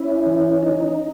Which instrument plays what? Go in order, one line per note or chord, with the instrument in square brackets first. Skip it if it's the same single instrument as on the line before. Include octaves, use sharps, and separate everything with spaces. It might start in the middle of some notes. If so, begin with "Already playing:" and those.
Already playing: [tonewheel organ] C#4 E4
E3
D#4